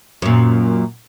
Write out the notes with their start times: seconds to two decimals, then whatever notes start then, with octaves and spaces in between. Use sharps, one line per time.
0.22 F#2 A#2